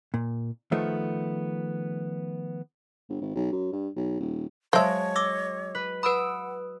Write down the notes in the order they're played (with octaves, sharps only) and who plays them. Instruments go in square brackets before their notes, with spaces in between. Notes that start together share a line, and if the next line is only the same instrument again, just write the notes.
[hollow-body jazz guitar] A#2
D#3 F3 A3 B3
[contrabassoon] G1
G#1
B1
F#2
G2
B1
D#1
[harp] F#3 G#3 [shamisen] C5 E5 [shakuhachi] C#5 [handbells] F5 A5
[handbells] D6 E6 [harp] A#6
[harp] B4
[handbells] B4 B5 [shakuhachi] F#5 [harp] D#6 E6 D7